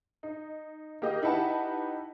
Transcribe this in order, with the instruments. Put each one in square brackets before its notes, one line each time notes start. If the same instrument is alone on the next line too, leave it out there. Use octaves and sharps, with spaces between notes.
[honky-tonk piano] D#4
A#3 G4 D#5
D#4 E4 G4 B4 F#5 A5